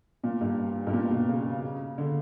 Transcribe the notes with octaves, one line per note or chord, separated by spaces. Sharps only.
A#2
G2
G2
A#2
B2
C#3
D3